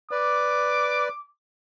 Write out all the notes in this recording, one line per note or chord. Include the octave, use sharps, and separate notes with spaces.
B4 D5 D6